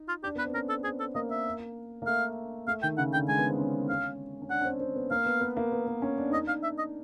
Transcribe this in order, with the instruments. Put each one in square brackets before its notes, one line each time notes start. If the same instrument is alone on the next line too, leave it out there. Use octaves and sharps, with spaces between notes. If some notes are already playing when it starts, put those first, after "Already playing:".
Already playing: [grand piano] D#4
[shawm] F4
[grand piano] D4 [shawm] G4
[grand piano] B3 [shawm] B4
[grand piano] C4
[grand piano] C#4 [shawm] A#4
[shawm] A4
[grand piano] C4 [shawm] G#4
[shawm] A4
[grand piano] A#3 [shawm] D#5
[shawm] E5
[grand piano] A#3
[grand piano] A3 [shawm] F5
[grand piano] A3 [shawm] F5
[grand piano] D#3 [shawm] G5
[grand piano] C#3 [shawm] F#5
[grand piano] D3 [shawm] G5
[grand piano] G#3 [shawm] G#5
[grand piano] B3
C4
C#4
[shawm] F5
[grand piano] C#4
[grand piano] D4 [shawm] F#5
[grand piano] C#4
C4
C4
B3
[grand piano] A#3 [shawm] F5
[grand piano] B3
B3
A#3
B3
B3
C#4
D4
[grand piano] D#4 [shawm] D#5
[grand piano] D4
[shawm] F5
E5
D#5